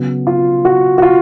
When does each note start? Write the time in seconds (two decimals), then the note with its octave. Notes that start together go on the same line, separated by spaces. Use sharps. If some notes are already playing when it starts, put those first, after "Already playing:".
Already playing: C#3 F#3 B3
0.27 F4
0.65 F#4
0.98 F#4
1.02 F4